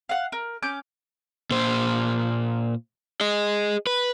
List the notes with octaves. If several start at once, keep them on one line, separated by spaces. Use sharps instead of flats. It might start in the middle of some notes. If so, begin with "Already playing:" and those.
F5 F#5
A#4
C#4 D6 G6
A#2 C5
G#4 D#5
B4